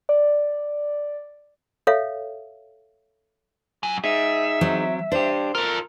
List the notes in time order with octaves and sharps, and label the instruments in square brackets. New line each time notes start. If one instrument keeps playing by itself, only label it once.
[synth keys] D5
[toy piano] A4 C#5 E5 F5
[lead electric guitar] F#3 G#5
[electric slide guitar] D#4 G#4 [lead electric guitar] E5
[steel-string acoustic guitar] F#3 C4
[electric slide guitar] D4 G4 [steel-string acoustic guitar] C5
[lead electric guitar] F4 A4 [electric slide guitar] A#4